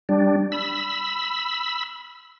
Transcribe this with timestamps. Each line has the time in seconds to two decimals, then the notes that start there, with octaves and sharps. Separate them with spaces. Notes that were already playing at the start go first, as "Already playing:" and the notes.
0.09 G3 D4
0.52 B5 E6